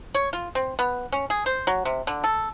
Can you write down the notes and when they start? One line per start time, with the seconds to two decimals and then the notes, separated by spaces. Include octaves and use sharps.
0.15 C#5
0.33 F4
0.55 C4
0.79 B3
1.12 C#4
1.30 G#4
1.46 C5
1.67 F#3
1.85 C3
2.07 D3
2.24 A4